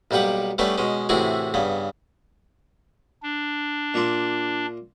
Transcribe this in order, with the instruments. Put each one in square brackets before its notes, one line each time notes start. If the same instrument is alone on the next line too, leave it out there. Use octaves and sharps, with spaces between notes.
[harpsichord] B1 G3 A#3 G4 B4 F#5
G3 A3 B3 C#4 D4 B4
B2 G#3 C#4
A2 C3 E3 E4 F#4 G#4
G2 C#3 B3
[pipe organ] D4
[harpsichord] A#2 E5 C6